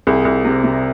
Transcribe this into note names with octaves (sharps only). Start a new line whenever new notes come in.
C2 G#4
C2
C3
C3